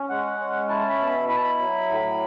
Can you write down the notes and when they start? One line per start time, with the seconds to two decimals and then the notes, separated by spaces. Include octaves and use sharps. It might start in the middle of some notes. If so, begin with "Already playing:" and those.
Already playing: C#4
0.09 G#3 F#5
0.39 C#4
0.69 E4 A5
0.89 B5
0.99 B2 A5
1.09 B5
1.29 E4 B5
1.35 A5
1.43 B5
1.59 F#3
1.88 A2